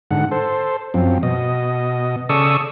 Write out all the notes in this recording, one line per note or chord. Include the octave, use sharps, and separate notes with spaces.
G#2 D3 F#5
A4 C5
F#2 F3 C4
B2 D#5
C#3 A4 D5 C#6 D#6 E6